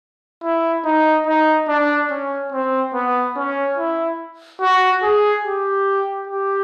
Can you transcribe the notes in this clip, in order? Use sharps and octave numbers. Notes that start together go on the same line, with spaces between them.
E4
D#4
D#4
D4
C#4
C4
B3
C#4
E4
F#4
G#4
G4
G4